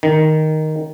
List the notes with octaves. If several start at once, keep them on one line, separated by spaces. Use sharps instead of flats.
D#3